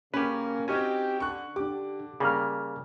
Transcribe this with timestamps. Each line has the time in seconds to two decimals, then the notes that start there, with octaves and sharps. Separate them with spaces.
0.14 C#3 A#3 C#4 G4 B4
0.68 C4 C#4 D#4 F#4 G4 G#5
1.20 D3 C#6 F#6
1.56 D3 D4 G4 D6
2.20 C#3 G3 A#3 G#4 A#5 F6